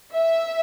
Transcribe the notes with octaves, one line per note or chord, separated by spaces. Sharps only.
E5